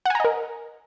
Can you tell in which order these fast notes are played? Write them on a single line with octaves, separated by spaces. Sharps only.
F#5 G#5 A#5 D#5 A#4